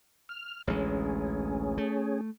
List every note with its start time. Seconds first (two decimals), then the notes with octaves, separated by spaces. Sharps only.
0.29 F6
0.68 A1 D2 G#3 C#4 G#4
1.78 A3